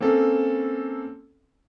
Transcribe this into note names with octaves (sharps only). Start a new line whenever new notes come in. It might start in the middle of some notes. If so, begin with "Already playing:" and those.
A#3 C4 C#4 A4